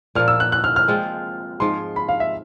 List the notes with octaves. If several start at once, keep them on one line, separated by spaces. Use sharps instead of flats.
A#2 F3 A#3 F6
E6
F#6
F#6
F6
F6
F3 G#3 C4 F4
G#2 F3 G#3 C6
B5
F5
E5